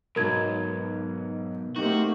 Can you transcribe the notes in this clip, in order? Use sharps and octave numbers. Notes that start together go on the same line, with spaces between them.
B1 G#2 F#3 A#4 G#6
A3 A#3 C4 D#4 F#4 G4